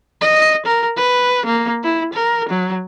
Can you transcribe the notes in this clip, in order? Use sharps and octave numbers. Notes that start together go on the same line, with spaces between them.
D#5
A#4
B4
A#3
E4
A#4
F#3